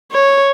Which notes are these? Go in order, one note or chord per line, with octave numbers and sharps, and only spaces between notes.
C#5